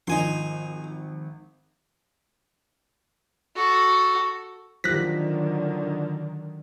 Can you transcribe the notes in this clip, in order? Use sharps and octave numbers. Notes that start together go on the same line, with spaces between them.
G#1 F3 D#4 G#5 C6
F#4 A4
D3 D#3 F3 F#3 G4 F#6 A#6 B6